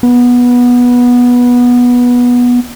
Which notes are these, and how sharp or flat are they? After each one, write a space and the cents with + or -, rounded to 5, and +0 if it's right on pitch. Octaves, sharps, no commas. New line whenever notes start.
B3 -15